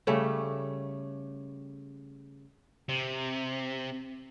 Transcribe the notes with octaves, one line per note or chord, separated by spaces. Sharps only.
C#3 G3 A3 C#4
C3